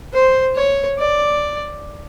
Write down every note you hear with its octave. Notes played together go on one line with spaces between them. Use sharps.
C5
C#5
D5